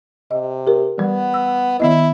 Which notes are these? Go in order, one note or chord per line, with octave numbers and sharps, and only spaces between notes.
C3 D#5
G4 A#4
E3 G3 B3
E6
D#3 B3 E4 D#5